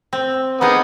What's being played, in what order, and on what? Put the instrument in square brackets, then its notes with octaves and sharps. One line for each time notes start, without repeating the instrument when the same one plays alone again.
[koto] C4
[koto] A#3 D#4 G#4 [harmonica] B3